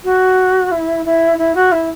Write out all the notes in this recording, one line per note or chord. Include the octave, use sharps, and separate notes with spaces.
F#4
E4
E4
E4
F#4
E4